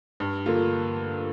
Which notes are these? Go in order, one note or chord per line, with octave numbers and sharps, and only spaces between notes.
G2
D3 A#3 F4